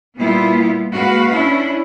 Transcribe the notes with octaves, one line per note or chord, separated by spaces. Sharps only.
A#2 G3 A#3 B3 E4 F4
G#3 A#3 F#4 B4 F5
C#4 D4 E4